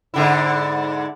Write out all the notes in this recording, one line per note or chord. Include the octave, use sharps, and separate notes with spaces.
G#2 D3 E4